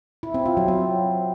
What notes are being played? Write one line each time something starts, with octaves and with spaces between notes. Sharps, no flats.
E4
C4
F4
F#3
C4